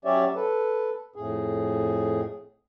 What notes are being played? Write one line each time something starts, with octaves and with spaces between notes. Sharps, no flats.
F#3 C#4 G4 C#5 D5 E5
A4 B4
F2 A2 G#4